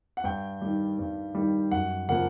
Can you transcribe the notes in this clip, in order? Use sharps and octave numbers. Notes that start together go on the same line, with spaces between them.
F#5
G2 G5
D#3 G3
G2
D#3 G3
F#2 F#5
C#3 F3 A#3 F#5